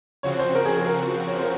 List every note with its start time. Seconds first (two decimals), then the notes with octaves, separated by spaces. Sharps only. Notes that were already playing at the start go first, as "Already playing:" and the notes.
0.23 C#3 F3 C4 F#4 C#5
0.39 C5
0.55 A#4
0.65 G#4
0.77 G#4
0.87 A#4
1.27 C#5
1.35 C5
1.43 A#4